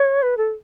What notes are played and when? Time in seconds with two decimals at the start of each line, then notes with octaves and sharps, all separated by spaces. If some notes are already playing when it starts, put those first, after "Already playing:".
Already playing: C#5
0.22 B4
0.37 A4